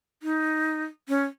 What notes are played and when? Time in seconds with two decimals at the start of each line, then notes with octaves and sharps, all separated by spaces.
0.23 D#4
1.09 C#4